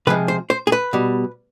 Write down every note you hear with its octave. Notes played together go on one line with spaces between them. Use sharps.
C3 F3 G#3 B4
C5
C5
G#4
B4
B2 G3